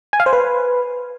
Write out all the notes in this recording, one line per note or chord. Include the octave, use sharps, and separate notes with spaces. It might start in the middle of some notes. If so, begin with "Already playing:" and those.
G#5
F5
C5
B4